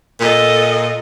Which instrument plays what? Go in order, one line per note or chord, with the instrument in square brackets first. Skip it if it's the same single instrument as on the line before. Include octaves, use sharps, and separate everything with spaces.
[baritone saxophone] A#2 [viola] A4 D#5